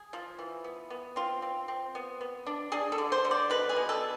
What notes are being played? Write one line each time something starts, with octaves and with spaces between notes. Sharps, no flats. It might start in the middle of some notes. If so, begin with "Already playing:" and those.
Already playing: G#4
F3
E3
B3
B3
C4 F4
C4
C4
B3
B3
D4
D4 G#4
A4
D3
C5
D3
D5
B2 B4
G#4
B2
A4